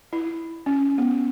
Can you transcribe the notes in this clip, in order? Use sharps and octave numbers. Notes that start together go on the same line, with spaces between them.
E4
C#4
B3